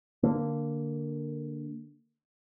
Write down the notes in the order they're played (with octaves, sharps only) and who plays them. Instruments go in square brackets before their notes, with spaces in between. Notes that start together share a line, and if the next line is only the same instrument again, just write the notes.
[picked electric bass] D3 A#3